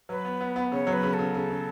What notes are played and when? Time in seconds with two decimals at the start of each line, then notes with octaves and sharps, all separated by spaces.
0.09 F#3 B4
0.25 B3
0.40 B3
0.56 B3
0.72 C#3 C#5
0.87 F#3
0.93 B4
1.03 C#3
1.13 A4
1.19 C#3
1.34 C#3
1.49 C#3